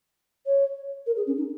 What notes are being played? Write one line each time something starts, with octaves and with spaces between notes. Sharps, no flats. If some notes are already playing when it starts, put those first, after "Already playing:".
C#5
A#4
G#4
C#4
D#4